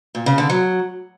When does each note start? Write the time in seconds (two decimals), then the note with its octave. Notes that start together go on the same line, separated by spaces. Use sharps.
0.15 A#2
0.26 C#3
0.38 D3
0.50 F#3